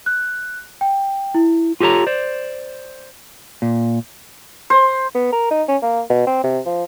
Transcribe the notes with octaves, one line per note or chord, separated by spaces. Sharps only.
F#6
G5
E4
F4 G4 A4 C#5 A#5
C5 D5
A#2
C5
B3
A#4
D#4
C#4
A#3
B2
C4
C3
F3